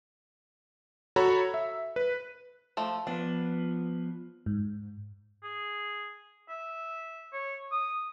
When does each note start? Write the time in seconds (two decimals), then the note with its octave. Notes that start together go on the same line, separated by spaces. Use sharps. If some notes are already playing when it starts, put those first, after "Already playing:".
1.16 F#4 A4 C#5 A#5 B5
1.54 E5
1.96 B4
2.77 F3 A3
3.07 F3 B3 D4
4.46 G#2
5.43 G#4
6.49 E5
7.33 C#5
7.71 D#6